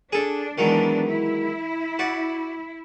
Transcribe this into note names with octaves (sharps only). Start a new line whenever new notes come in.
D4 G#4 A4
D#3 E3 F#3 G#3 B3 D4
E4
F#4 D5